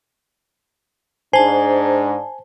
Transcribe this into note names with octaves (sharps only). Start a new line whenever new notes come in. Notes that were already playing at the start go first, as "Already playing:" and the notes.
G#2 D4 C5 G#5 A5